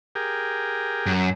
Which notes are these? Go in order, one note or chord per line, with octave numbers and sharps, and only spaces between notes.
G4 G#4 A#4
F#2